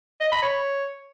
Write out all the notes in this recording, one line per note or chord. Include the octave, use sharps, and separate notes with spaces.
D#5
B5
C#5